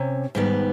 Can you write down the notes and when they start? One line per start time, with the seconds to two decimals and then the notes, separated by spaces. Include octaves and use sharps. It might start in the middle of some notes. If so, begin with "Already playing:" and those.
Already playing: C3 C#4
0.35 G#2 D#3 G3 B3